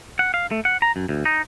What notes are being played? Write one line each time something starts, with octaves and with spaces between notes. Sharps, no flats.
F#5
F5
A3
F#5
A#5
F#2
D2
D#4